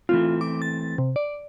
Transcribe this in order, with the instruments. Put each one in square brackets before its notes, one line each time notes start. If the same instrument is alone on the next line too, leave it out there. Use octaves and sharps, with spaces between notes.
[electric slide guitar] E3 A3 C4 [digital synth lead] F4
[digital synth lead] D6
A6
C3
D5